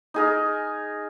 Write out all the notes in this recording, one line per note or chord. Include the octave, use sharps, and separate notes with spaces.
D#4 G#4 A#4